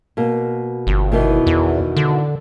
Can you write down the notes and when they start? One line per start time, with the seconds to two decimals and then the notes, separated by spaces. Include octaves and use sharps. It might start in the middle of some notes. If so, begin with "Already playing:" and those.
0.17 B2 A#3
0.87 G1
1.12 B2 D#3 E3
1.47 E2
1.96 D3